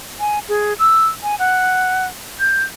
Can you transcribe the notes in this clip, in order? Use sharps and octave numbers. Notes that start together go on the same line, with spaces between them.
G#5
G#4
E6
G#5
F#5
G6